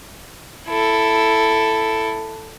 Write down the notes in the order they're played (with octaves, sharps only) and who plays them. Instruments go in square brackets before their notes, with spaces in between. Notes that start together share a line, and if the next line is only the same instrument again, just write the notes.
[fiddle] E4 A4